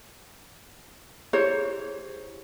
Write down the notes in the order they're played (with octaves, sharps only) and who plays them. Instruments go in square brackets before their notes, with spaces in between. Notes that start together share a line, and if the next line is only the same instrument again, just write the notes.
[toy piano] E4 G4 G#4 [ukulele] C5 C#5